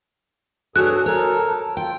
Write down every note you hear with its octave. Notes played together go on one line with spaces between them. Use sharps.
G2 F#4 G#4 A4 C#5 D5 F#6
A4 A#4 C#5 A5
F4 G5